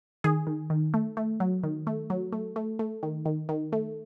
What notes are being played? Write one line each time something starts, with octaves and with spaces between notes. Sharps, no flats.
D#3 G#4
D#3
D#3
A3
A3
F#3
D#3
A3
F#3
A3
A3
A3
D#3
D#3
D#3
A3